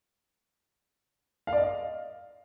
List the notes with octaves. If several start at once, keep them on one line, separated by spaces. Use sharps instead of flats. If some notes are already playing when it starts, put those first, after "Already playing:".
F5
D5
D#5